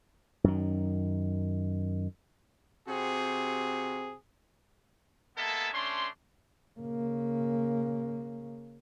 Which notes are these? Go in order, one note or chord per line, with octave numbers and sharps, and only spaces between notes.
F#2 D#3
C3 C4 F#4 G#4
G#3 A#3 B3 A4 E5 A5
A3 C#4 D4 C6
C#3 A#3